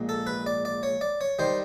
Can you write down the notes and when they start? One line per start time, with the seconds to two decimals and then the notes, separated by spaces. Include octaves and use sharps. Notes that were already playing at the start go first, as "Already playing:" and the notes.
Already playing: A#1 A#2 G#3
0.09 A4
0.27 B4
0.46 D5
0.65 D5
0.83 C#5
1.01 D5
1.21 C#5
1.39 D#3 G3 C5